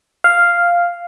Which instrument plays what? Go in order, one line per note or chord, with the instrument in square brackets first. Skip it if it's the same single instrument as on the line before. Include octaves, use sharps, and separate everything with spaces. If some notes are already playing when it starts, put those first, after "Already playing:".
[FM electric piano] F5